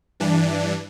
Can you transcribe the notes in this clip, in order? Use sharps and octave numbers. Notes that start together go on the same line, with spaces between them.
G2 E3 D4